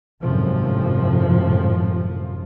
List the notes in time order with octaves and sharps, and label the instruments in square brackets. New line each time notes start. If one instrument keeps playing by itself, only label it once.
[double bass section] G#1 F#2 A2 C3 F3